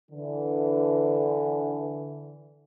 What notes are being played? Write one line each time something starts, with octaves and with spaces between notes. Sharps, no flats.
D3 E3